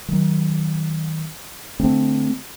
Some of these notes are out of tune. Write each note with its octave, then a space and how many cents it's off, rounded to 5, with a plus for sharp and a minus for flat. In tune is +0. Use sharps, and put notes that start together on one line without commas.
D#3 +25 F#3 +30
D3 +0 A3 +0 C4 +0